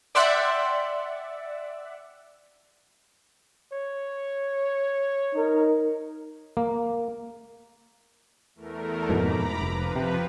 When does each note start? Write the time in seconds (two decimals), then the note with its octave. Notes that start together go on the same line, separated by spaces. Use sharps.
0.15 D5 E5 F#5 G5 C6 F#6
3.72 C#5
5.35 D#4 A#4
6.57 A#3
8.55 E2 A3 A#4
9.09 F2 G#2 B2 A#5 B5 D6
9.61 F1 F3 B4
9.96 C3